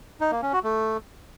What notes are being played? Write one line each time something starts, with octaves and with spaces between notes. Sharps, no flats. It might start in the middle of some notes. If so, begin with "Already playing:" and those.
D#4
A#3
C#4
F#4
A3